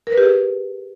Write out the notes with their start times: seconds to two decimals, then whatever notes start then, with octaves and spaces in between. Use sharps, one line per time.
0.07 A#4
0.12 B4
0.18 G4
0.23 G#4